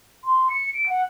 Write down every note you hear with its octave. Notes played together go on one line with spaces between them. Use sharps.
C6
C#7
D7
F#5